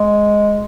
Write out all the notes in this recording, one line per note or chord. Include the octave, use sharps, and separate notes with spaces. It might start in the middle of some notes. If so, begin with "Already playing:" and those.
Already playing: G#3